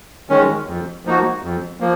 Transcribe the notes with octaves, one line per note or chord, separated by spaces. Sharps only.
D#3 G#3 C#4
F2
F3 A#3 D#4 F#4
F2
F3 A#3